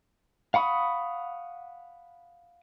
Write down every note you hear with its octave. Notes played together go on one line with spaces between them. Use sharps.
F5 F#5 B5 C#6 D#6